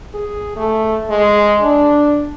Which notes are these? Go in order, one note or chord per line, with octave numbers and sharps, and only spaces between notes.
G#4
A3
G#3
D4